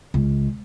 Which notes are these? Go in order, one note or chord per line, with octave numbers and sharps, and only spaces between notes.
C#2